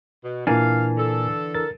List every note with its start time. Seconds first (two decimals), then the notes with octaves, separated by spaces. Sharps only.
0.23 B2
0.47 A#2 E3 D4 A#4 F5 G#5
0.97 D3 A4
1.55 A#4 A6